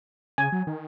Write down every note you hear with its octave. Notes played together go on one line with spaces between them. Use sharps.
C#3 G#5
F#3
D#3